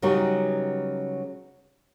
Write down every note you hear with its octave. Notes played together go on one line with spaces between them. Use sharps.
C#3 F#3 G3 B3 D#4 F#4